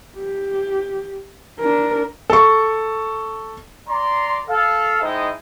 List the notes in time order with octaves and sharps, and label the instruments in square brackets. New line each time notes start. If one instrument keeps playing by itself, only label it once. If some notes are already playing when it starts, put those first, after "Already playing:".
[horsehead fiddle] G4
D4 A#4
[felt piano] A4 C#6
[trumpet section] D5 A#5 C6
A4 F5
G#3 D#4 E4 C5 D#5 G5